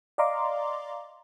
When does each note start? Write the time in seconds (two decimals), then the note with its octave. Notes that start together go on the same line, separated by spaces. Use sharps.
0.18 D5 D#5 F5 A#5 C6 D6